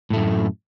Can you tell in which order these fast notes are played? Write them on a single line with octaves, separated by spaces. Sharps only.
A2 A3 F#2